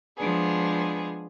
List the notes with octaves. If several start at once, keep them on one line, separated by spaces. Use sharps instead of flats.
F3 G#3 B3 D4 G#4